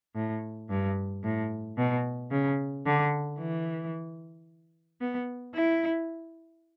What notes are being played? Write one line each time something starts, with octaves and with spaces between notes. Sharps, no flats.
A2
G2
A2
B2
C#3
D3
E3
B3
E4